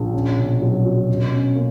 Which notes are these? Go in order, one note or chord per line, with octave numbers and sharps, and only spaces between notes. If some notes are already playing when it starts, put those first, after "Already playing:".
Already playing: A#1
C#4
B2
F#3
F#4
B2
C#4
A#3